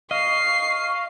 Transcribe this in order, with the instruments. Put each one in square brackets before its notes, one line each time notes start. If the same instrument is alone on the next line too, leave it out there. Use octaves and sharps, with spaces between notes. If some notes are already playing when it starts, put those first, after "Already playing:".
[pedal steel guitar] D#5 [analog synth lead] F5 [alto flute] C#6 [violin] C7